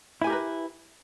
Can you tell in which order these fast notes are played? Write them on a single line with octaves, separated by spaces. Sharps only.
E4 G#5 G4 A#4 B4